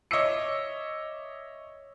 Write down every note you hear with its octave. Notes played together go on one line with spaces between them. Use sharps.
C#5 D#5 E5 D6 E6 C#7